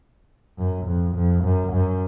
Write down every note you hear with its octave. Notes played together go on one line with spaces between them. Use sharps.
F#2
F2
F2
F#2
F#2